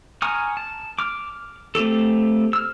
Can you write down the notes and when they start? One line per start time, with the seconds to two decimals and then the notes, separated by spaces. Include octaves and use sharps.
0.22 G#5 A#5 C#6 D#6 F6
0.57 A5
0.99 D6 F6
1.75 A3 C4 G4 A4
2.53 E6 F6